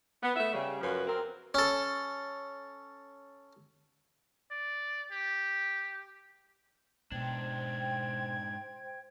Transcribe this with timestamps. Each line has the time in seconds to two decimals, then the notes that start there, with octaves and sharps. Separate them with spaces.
0.23 B3
0.36 A3 B3 E5
0.53 C#3 G3
0.81 F#2 F3 F#4 B4
1.07 C4 A#4
1.54 C#4 A4
4.51 D5
5.11 G4
7.12 G#2 B2 D4 C5 G5 G#6